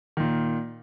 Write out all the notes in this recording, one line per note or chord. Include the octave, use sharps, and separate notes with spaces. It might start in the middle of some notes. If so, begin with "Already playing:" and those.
A#2 D#3